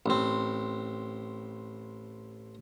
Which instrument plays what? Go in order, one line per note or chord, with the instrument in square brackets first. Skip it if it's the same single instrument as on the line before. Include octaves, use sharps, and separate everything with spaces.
[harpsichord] A1 C4